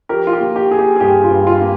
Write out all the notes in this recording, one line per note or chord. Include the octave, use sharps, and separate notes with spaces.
F3 G4 A#4
F4
G4
A#3
G4
A#3 G#4
G4
G#4
G2 G4
F4
G2
F4
A#3